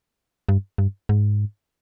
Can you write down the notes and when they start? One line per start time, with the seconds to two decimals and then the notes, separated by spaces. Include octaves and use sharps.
0.49 G2
0.78 G2
1.09 G#2